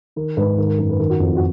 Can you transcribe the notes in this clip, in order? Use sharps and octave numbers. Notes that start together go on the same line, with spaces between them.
D#3 A#4
G#2 B4
D#3 A#4
A#4
F#2 A#4
B4
D#3 A#4
F#4
F2 F4
F4
F#4